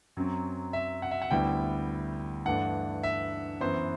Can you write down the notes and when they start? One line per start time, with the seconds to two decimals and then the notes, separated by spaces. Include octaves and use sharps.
0.17 F#2 F#3 C4
0.73 E5
1.02 F#5
1.11 E5
1.22 F#5
1.31 D2 D3 G3 B3 E4 G5
2.46 G2 E3 A3 D4 F#5
3.03 E5
3.61 F#2 E3 B3 C5